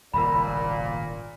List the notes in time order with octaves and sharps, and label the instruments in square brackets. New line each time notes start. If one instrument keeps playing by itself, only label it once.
[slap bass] D#1 G#1 C#3 [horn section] A#2 [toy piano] A#4 B5